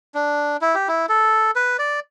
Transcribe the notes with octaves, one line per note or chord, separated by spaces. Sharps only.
D4
E4
G4
E4
A4
B4
D5